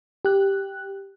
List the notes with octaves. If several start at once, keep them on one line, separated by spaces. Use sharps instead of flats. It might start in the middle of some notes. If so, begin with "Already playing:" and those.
G4 F#6